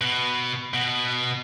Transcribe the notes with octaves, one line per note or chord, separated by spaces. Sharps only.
B2
B2